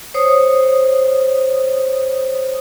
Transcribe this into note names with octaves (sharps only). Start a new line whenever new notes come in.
C5 C#5 D#6